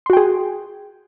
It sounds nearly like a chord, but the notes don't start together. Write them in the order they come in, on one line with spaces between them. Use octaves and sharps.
C6 F#4 G5 G#4